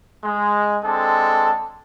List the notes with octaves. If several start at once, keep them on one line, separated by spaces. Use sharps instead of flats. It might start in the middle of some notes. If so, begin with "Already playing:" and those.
G#3
G#3 C4 D4 A4